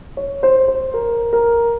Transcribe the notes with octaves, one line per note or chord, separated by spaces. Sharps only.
C#5
C5
C5
A#4
A#4